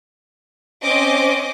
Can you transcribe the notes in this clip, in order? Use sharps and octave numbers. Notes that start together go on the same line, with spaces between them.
C4 C#4 C5 D#5 D6